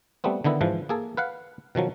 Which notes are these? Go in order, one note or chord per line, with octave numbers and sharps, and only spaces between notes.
G3 A3 B3 C4
D3 D#3 B3 E4
G#2 E3 F3
A#3 G#4 A4
B4 F5 F#5
B2 D#3 F3 F#3